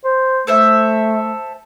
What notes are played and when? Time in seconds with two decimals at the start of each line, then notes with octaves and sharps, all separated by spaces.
0.04 C5
0.47 A3 A4 C5 E5